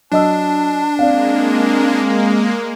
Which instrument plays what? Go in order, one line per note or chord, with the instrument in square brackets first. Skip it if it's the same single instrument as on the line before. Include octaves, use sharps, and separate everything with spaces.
[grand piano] F#3 D#5 E6 [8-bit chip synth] D4 [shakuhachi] A5
[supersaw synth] G#3 A#3 [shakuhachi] C4 [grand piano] D5 F5